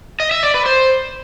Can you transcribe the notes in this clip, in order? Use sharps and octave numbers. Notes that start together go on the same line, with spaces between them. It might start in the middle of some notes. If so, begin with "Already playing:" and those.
D#5
E5
D5
B4
C5